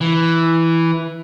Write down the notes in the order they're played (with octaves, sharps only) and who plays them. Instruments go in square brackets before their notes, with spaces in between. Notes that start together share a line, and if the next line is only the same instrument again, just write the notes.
[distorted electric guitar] E3